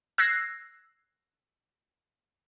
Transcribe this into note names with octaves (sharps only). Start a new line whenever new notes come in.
E6 F#6 G#6 A#6 C7